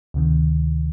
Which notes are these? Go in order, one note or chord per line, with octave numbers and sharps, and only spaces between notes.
D2 C3 D#3